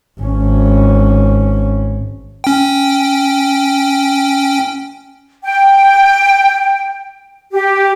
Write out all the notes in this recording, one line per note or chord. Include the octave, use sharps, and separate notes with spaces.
G#1 C#4
C#4 G5
G5
G4